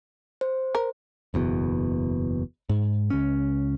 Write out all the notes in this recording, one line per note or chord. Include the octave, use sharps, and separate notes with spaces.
C5
A#4
F#1 E2 B2
G#2
C#2 C#4